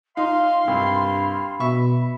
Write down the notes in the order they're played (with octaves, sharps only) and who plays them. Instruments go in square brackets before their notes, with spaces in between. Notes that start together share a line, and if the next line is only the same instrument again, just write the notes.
[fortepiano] D#4 [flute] F4 [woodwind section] F5 C6
[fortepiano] C2 [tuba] G2 [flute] B5
[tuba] B2 [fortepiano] E5 C#6